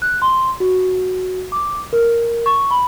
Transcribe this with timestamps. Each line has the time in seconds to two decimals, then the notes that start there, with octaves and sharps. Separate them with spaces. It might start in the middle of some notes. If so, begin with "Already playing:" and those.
0.02 F#6
0.22 C6
0.60 F#4
1.52 D6
1.93 A#4
2.46 C#6
2.71 B5